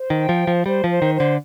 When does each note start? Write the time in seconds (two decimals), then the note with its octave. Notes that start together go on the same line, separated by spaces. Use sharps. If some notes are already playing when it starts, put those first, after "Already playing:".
Already playing: C5
0.10 D#3
0.16 G5
0.29 F3
0.40 C5
0.47 F3
0.66 G3 C5
0.84 F3
0.89 C5
1.02 D#3
1.14 C5
1.20 D3